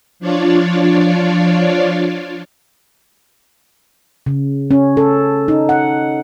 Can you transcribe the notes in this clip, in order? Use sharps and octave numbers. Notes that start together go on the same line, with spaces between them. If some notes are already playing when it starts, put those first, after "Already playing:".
F3 D4 F4 C#5 D5
C#3
C#4
A4
D#4
F#5